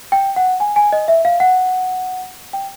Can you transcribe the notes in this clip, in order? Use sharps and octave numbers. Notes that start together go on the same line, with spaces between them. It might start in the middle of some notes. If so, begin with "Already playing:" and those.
G5
F#5
G#5
G#5
D#5
E5
F5
F#5
G5